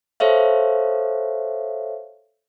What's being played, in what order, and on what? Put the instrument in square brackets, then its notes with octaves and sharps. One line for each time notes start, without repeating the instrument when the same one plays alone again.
[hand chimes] A4 C5 C#5 E5 F5